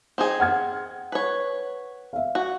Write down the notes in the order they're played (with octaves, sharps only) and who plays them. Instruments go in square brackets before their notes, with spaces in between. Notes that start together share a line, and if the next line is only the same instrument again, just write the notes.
[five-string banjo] C4 D#4 G#4
[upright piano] F#5 F6 G#6
[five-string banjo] B4 C#5
[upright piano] E5 F5
[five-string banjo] F#4